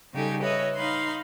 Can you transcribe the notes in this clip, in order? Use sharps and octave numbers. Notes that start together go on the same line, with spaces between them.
C#3 G3 D#4 G4 A4 G#5
B4 C#5 D#5 E5
D#4 F5 B5 C6